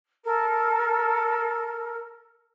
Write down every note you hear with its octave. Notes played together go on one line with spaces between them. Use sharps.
A4 A#4